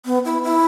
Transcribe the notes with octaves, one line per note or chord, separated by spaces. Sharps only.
B3
E4
E4